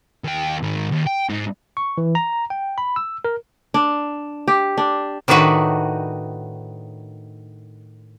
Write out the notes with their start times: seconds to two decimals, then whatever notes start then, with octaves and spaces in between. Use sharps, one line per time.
0.24 D#2 G5
0.63 G#2 D#3
0.91 D#2
1.06 G5
1.29 G#2
1.77 C#6
1.98 E3
2.15 A#5
2.50 G5
2.78 B5
2.96 E6
3.25 A#4
3.74 D4
4.48 G4
4.78 D4
5.28 A2 D#3 D4 D#4 F#4 B4